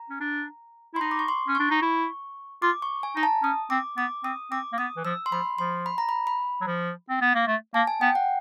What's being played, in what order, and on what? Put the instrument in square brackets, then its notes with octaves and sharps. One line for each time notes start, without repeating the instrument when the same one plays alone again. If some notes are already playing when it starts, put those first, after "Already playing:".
Already playing: [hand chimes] A#5
[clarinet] C#4
D4
[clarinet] E4 [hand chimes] C6
[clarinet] D#4 [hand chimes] B5
[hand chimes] D6
C#6
C6
[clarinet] C#4
[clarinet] D4 [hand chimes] C#6
[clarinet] D#4
E4
[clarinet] F4 [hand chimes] D6
[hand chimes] C#6
G#5
[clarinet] D#4 [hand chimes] A#5
[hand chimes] A5
[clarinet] C#4 [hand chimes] D#6
[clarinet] C4 [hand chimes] D6
[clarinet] B3 [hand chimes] D6
[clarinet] C4 [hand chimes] D#6
[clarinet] C4 [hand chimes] D6
[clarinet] A#3
[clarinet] B3 [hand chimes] D#6
[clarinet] E3
[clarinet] F3 [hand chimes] E6
[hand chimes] C6
[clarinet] F3 [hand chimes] B5
[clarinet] F3 [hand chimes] C6
[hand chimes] B5
A#5
B5
B5
[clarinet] F#3
F3
C4
B3
A#3
A3
[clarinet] A#3 [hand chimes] A5
[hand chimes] G#5
[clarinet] B3 [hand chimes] G5
[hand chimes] F#5